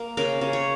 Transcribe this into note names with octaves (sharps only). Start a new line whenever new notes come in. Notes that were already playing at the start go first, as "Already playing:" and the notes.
Already playing: A#3
C#3 A#4
C#3
C#5